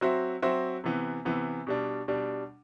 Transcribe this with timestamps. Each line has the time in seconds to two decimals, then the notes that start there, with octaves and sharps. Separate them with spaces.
0.01 F#3 C4 F#4 C5 E5
0.42 F#3 C4 F#4 C5 E5
0.84 C3 E3 B3
1.25 C3 E3 B3
1.67 B2 G3 D4
2.08 B2 G3 D4